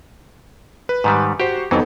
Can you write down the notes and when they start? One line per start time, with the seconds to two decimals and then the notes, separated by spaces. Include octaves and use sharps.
0.89 B4
1.04 G#2 D#3 G3
1.40 F#4 G4 C5
1.71 F2 E3 F#3 B3 D#4 A4